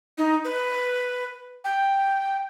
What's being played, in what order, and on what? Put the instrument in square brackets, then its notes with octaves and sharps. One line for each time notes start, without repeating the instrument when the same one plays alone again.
[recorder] D#4
B4
G5